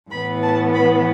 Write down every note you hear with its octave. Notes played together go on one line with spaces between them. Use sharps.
A2 E3 B3 B5
A5
B5